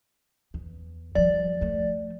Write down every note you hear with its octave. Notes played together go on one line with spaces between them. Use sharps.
E2
F3 G3 D5
F3 A3